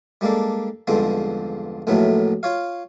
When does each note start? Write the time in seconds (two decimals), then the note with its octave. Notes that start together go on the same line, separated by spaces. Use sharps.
0.21 G3 G#3 A#3 D4 A4
0.87 E2 G2 D3 F3 G#3 C4
1.87 A#1 A2 D#3 E3 F#3 A3
2.43 F4 C#5 F5